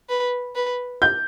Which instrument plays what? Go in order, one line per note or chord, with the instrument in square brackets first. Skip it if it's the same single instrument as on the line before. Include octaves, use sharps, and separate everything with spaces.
[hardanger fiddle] B4
B4
[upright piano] G6